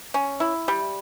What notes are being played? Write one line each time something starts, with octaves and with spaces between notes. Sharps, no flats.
C#4
E4
G3